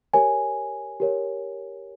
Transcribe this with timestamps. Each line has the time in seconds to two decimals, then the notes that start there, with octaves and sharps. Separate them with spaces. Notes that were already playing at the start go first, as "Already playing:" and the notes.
0.14 G4 A#4 C#5 G#5
1.00 G4 A#4 C#5